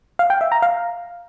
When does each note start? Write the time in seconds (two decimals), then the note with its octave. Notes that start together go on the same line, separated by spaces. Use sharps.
0.19 F5
0.30 G5
0.41 E5
0.52 A#5
0.62 F5